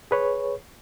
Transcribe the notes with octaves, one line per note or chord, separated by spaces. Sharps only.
G#4 B4 C#5